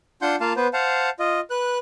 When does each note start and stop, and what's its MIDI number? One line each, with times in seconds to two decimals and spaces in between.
0.22 0.36 62
0.22 0.36 65
0.22 0.36 78
0.22 0.36 84
0.22 0.36 91
0.40 0.53 58
0.40 0.53 65
0.40 0.53 77
0.40 0.53 81
0.56 0.67 59
0.56 0.67 71
0.56 0.67 72
0.73 1.10 72
0.73 1.10 77
0.73 1.10 78
0.73 1.10 81
1.19 1.40 65
1.19 1.40 75
1.50 1.78 71
1.50 1.78 90